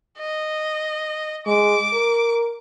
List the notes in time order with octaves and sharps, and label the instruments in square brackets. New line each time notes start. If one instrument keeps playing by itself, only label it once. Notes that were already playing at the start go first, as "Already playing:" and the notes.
[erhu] D#5
[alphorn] G#3 [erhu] D6
[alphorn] A#4